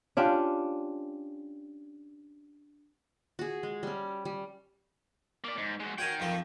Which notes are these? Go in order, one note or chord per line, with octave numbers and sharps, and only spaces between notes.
C#4 D4 F4 G4
F#4 G#4
G#3
G3 C#4
G3
A#3 D5
G#2
G#3 F#4
F#4 A#4 C#5 G5 G#5
F2 F3 A4